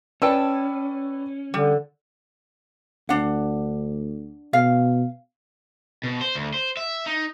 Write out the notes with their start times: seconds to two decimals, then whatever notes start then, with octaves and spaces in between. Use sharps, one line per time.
0.22 C#4 B4 D5 G5 A5 E6
1.54 D3 G3
3.09 D2 D4 F#5
4.53 B2 F5
6.03 B2
6.21 C5
6.35 D2
6.54 C5
6.77 E5
7.06 D#4